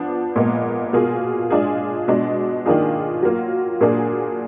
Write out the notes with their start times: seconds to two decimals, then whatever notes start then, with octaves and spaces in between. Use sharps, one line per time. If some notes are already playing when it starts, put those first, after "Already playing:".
Already playing: F3 B3 D4
0.36 A#2 G#3 B3
0.93 B2 A#3 F4 G#4
1.50 G#3 D4 F4 G#4
2.08 B2 G#3 D4
2.66 D#3 A#3 D4 F4 G#4
3.23 F#3 A#3 F4
3.81 A#2 F#3 A#3 D4 G#4